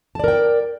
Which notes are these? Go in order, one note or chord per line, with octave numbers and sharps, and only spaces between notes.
A#4 D5 G5 A5